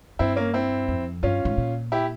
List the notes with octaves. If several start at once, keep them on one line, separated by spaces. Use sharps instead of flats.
G2 C4 E4
A#3 C#4
C4 E4
F2
G2 C#4 F4
G#2
A#2
E4 G4